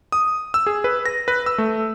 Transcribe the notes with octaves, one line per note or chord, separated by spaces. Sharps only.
D#6
E6
G#4
B4
A#6
B4
E6
A3